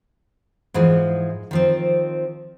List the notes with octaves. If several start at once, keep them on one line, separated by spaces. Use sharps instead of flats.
G#2 E3 F3 G#3
D#3 F3 C4